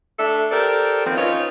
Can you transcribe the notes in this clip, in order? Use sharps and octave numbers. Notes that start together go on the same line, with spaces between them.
A3 D4 A4 E5
G4 A4 A#4 C5 D5
D#3 F3 B3 C4
C#4 D#4 F4 B4 C#5